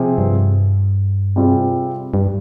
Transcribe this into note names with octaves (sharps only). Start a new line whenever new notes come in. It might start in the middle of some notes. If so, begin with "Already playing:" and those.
Already playing: C3 F3 C4 F4 G#4
G2
C3 G3 C4 F4 G#4
G2